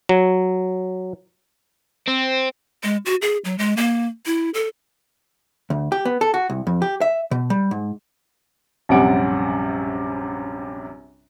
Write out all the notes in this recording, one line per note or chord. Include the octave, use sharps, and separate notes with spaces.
F#3
C4
G#3
F#4
G#4
F#3
G#3
A#3
E4
A4
D2
G4
B3
A4
F#4
C2
F2
G4
E5
B2
G3
G#2
A#1 F#2 C3 G3 F#5 D7